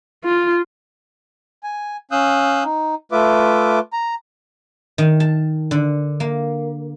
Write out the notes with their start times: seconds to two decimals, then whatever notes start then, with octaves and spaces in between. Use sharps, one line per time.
0.25 F4
1.63 G#5
2.11 C#4 F5 D#6 E6 F#6 G6
2.64 D#4
3.12 A3 F4 B4 E5 D6
3.93 A#5
4.98 D#3
5.20 A5
5.71 D3
6.20 A#3